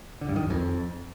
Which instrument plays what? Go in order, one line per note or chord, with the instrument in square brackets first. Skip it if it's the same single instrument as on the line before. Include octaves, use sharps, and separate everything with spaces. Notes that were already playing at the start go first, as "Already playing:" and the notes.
[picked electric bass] D3
G2
D#3
F#2
F2